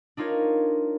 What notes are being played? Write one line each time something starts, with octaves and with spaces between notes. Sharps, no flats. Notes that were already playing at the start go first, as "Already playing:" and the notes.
D4 D#4 F4 A#4 C#5